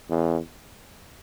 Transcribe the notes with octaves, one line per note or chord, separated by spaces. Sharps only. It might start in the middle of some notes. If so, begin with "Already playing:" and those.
E2